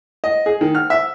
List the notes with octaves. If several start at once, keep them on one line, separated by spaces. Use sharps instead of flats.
D#5
G#4
D#3
F6
E5